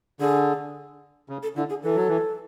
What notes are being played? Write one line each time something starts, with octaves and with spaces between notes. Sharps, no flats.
D3 G#4
C#3
A4
D3 E4
G#4
E3 A4
F#3
E3